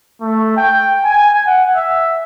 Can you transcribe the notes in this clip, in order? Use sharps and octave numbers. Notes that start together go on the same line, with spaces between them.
A3
G5
G#5
F#5
E5